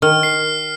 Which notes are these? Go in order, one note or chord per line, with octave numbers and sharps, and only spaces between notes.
D#3 F6
C7